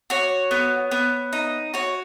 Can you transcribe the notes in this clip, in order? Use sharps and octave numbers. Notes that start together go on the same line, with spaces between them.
F#4 C#5
B3
B3
D#4
F#4 C#5